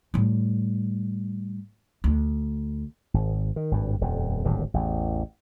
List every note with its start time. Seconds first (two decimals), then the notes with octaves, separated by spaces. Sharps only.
0.14 A2 G3
2.04 D2
3.14 G#1
3.56 D#3
3.71 G#1 G2
4.01 D#1 F2
4.45 D1 G#1 G2
4.74 A1 E2